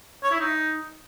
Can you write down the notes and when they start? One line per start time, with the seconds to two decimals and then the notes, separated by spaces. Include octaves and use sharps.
0.23 C#5
0.31 E4
0.40 D#4